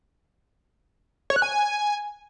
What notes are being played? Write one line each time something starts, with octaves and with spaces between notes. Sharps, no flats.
C#5
F#6
G#5